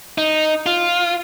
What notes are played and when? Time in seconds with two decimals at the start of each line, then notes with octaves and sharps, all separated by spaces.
0.18 D#4
0.66 F4